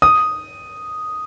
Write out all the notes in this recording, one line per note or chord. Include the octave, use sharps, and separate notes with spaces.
D#6